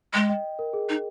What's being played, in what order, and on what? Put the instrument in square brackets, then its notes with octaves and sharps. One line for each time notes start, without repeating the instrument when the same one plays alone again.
[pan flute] G#3 [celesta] D#5 G5
[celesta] D#5 G5
A#4
G#4
[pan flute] D#4